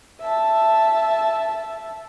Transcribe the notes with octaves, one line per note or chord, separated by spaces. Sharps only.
E5 A5